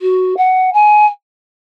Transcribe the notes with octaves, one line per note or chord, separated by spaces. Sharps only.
F#4
F#5
G#5